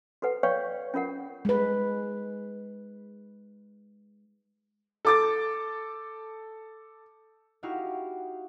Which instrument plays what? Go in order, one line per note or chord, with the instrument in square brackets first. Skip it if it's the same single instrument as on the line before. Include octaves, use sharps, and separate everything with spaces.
[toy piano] F#4 A4 B4 F#5
B4 C#5 D5 F5 G5 C#6
C#4 F4 A#4 F#5
[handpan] G#3 B4
[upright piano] A4 D6 A6
[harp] D#4 E4 F#4 G4 F5